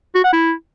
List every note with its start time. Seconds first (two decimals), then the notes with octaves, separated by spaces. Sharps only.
0.15 F#4
0.24 F#5
0.33 E4